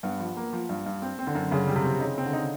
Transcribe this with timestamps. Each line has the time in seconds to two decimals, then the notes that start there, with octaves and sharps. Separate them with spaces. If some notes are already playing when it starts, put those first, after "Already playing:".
0.03 G2 B3
0.20 F3
0.37 A#3
0.53 F3
0.69 G2
0.86 G2
1.02 C4
1.19 C4
1.27 D3
1.35 F#2
1.51 F#2 C#3
1.67 G3
1.76 C3
1.84 C4
2.00 C#3 D#4
2.18 C4
2.26 D3
2.33 D#4